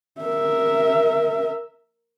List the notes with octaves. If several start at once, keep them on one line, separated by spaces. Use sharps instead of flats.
A#4 E5